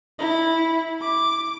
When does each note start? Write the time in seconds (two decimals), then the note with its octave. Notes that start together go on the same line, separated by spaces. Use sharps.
0.19 E4
1.01 D6